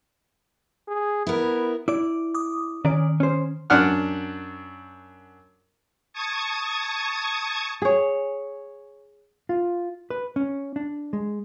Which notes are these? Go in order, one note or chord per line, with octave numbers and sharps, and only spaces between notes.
G#4
B3 E4 A#4
E4 D5 D6
D6 D#6
D#3 C#4 D5
C#4 C5
F#2 D4 F#5 F6
A5 C#6 D#6 G#6
G#4 C#5
F4
B4
C#4
D4
G#3